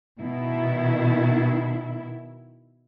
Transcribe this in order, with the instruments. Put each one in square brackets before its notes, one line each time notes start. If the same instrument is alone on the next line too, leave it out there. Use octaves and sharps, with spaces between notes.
[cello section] B2 D#3 E4